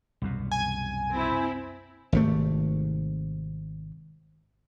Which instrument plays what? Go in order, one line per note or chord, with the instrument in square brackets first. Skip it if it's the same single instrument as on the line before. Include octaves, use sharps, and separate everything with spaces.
[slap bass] C2 F#2 B2
[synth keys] G#5
[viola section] C4 E4
[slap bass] G#1 C3 A3